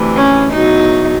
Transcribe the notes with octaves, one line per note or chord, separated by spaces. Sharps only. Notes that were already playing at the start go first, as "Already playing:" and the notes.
Already playing: D2 C3 E3
C#4
E2 B2 F#3 D#4